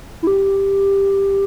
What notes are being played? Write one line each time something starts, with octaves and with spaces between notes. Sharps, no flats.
E4
G4